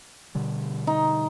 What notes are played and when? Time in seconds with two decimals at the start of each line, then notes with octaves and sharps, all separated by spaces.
0.35 B2 D3 G3
0.87 D#4